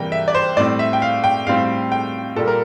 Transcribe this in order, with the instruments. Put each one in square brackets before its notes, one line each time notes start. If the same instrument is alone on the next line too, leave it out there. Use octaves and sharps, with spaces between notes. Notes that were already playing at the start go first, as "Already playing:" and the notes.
Already playing: [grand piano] C3 E3 G3 A#3 G5
E5
D5
C5
A2 G3 C4 D5
E5
G5
F5
G5
A2 G3 C4 F5
G5
A#2 G3 A#3 A4
A#4